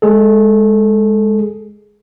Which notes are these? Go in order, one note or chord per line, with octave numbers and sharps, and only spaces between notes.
G#3 G#4 A4